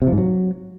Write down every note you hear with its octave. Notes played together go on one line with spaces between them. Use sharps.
C3
F3
G#2
F#3